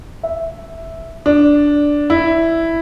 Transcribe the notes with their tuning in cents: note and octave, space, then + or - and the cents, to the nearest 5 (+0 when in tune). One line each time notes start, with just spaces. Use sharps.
E5 -5
D4 -5
E4 +0